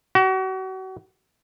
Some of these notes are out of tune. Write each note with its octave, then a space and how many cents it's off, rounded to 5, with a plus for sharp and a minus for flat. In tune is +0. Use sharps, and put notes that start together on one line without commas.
F#4 +35